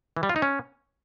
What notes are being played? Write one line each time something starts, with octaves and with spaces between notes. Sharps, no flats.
E3
G3
F4
D#4
C#4